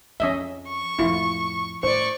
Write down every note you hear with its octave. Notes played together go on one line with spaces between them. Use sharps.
F2 F3 C#4 D#5 E5
C#6
F2 A2 E4 F4
A2 C5 D5 C#6